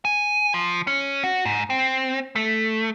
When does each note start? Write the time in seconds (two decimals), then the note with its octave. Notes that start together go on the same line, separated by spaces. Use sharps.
0.05 G#5
0.54 F3
0.87 C#4
1.24 F#4
1.45 G#2
1.70 C4
2.36 A3